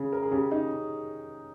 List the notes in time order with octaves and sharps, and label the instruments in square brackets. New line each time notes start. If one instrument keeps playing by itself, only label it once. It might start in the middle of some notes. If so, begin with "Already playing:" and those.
Already playing: [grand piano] C#3 [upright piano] C#4
[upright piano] A#4
G#4
[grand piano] C#3 [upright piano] G4
[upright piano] D#4